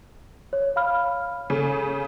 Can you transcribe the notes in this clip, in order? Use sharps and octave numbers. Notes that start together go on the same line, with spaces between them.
C#5
F5 B5 F6
C#3 A4